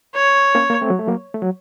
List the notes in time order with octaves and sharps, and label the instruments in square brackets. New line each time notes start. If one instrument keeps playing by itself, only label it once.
[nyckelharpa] C#5
[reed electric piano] A#3 C#4
A#3
A3 C4
F#3
A3
F#3 A#3
A3
F#3